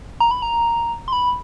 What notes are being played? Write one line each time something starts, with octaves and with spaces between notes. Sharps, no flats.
A#5
B5
A#5
C6
B5